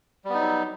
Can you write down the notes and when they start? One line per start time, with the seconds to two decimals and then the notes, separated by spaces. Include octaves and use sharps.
0.25 G3
0.30 B3
0.34 D#4
0.39 F#3